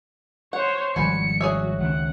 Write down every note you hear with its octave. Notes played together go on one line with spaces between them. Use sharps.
C5 C#5 F#5
G#1 F3 G3 F#4 B4 G#5 C#7
F#4 G#4 C#5 E5
C#2 D#3 C4 F#5